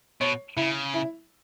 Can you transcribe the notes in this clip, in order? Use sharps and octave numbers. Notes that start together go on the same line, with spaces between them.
B2 C#5
C#3 E4
E4